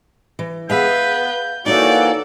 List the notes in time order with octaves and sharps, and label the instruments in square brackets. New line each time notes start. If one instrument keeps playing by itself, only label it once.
[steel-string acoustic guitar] E3
[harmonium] B3 [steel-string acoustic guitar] G#4 E5 F5 [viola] B4 [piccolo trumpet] G6
[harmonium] E3 A#3 F#4 [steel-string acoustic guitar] D#4 C#5 [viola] A4 D5